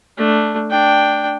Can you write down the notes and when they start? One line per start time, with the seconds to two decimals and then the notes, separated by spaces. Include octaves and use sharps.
0.17 A3 D4
0.70 D4 G5